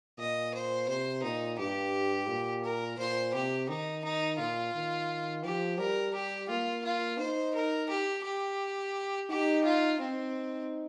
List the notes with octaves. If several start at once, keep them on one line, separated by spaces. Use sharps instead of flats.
A#2 D#5
C5
C3 C5
A#2 D#4
G2 G4
A#2
A#4
A#2 C5
C3 G4
D#3 D#4
D#4
A#2 F4
D#3
F3 G4
G3 A#4
G4
A#3 F4
F4
D#4 C5
A#4
G4
G4
D#4 G4
F4
C4 D#4